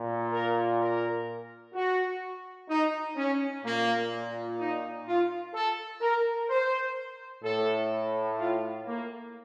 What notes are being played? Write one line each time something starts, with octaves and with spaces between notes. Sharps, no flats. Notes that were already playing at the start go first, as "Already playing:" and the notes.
Already playing: A#2
A#4
A#4
F#4
D#4
C#4
A#2 A#3
D#4
F4
A4
A#4
C5
A2 A4
F4
A#3